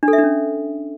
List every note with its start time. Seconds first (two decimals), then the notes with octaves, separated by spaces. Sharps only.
0.03 D4
0.08 A4
0.13 E5
0.18 D4
0.23 C#4